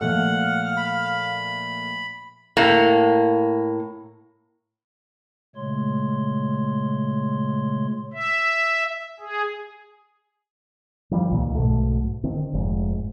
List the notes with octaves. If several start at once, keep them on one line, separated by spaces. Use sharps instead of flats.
A#2 F3 A3 F5 F#5 F6
B5
A2 A#3
A#2 C#3 G#3 A3 C#5 C6
E5
G#4
D#3 F3 G3
C#2 A#2 D#3
B1 G#2 B2 A3
D3 D#3 C4
F1 G#2